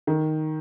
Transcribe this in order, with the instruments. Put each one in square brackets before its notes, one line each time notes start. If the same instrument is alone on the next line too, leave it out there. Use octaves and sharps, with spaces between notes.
[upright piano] D#3